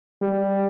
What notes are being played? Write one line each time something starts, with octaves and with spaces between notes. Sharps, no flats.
G3